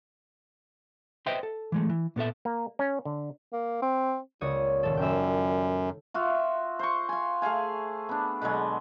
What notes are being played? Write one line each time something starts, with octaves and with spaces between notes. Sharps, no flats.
B4 C5 D#5 E5 G5 C6
A4
E3 G#3 A3
E3
A#2 B3 A4 E5
A#3
C#4
D3
A#3
C4
C#2 A#2 C#5 D#6
D#1 A4
F#2 G5 E6
F4 F#4 E5
C5 C#6
F5 G#5
A3 G#4 F5 G#5
B3 D4
B2 D3 F#3 G#3